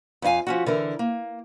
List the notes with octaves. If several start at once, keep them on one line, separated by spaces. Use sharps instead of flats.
F2 C#4 E4 F5 G#5
F3 C#4 F#4
D3 E3 A#4
A#3